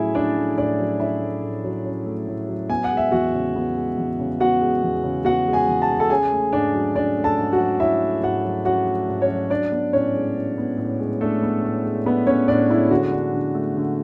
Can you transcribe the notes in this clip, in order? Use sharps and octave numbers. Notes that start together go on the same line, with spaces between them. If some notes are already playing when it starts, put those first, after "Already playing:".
Already playing: A2 F#3 A3 C#4 E4 G#4 E5
C#4 D4 D5
A3
A2 D4 D5
F#3
C#4 E4 E5
A3
A2
F#3
C#4
A3
A2
F#3
B3 G#5
F#5
G#3
E5
E2 F#4 F#5
C#3
B3
G#3
E2
C#3
B3 F#4 F#5
G#3
E2
C#3
B3 F#4 F#5
G#3
G#4 G#5
E2
A5
C#3
A4 A5
C#4 G#4 G#5
A3
G#2 D4 D5
F#3
C#4 D4 D5
A3
A4 A5
G#2
F#4 F#5
F#3
C#4 E4 E5
A3
G#2 F#4 F#5
F#3
C#4 F#4 F#5
A3
G#2
C#4 C#5
F#3
D4 D5
B3
A2 C#4 C#5
G#3
D4
B3
A2
G#3
A3 D4 A4
B3
A2
G#3
B3 D4 B4
B3 C#4 C#5
A2 D4 D5
G#3 E4
D3 F#4
D4
D3
A3
D3